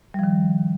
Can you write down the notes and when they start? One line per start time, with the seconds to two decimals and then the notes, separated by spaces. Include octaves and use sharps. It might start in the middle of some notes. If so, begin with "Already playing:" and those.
0.14 G3
0.19 F3
0.23 D#3